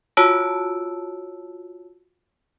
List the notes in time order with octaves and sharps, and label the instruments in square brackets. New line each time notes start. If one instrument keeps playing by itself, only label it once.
[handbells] F4 F#4 C#5 A5 E6 D7